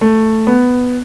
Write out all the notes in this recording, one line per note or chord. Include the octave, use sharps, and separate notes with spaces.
A3
B3